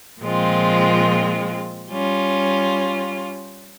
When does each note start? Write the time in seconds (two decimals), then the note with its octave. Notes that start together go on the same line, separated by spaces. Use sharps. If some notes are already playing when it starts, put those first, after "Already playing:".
0.21 A#2 F3 G#3 C4 F4
1.89 G3 C#4 F4